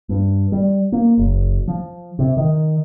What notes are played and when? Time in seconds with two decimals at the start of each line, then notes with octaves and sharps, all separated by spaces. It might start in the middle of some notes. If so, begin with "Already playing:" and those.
0.09 G2
0.52 G3
0.92 A#3
1.18 F#1
1.68 F3
2.19 C3
2.37 D#3